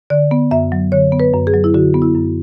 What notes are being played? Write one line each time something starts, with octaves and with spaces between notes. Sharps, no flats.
D3 D5
B3
F#2 E5
F#3
D3 C#5
B3
B4
F#2
G#4
F#3
E4
D3 F#4
B3
E4
F#2